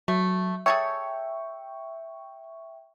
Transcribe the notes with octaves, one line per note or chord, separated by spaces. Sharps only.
F#3 A3
G#4 A4 C#5 E5 G5 C#6